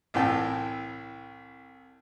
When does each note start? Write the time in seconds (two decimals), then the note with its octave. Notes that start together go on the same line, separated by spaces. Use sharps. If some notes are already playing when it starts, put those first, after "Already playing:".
0.14 C2 A2 E3 G5 A5